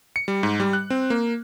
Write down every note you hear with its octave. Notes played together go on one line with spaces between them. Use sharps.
C#7
G3
G#2
G3
F#6
C4
A#3